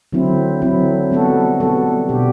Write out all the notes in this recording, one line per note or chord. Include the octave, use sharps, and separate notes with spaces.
D3 F#3 C4 E4
D3 F#3 C4 E4
G3 B3 F#4 A4
G3 B3 F#4 A4
B2 G3 D4 G4